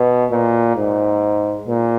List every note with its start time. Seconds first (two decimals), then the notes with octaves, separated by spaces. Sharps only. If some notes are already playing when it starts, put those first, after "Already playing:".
Already playing: B2
0.31 A#2
0.76 G#2
1.68 A#2